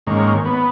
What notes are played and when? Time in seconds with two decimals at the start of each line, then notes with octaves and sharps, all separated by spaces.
0.07 G#2 D#3 A#3 C#4
0.45 B3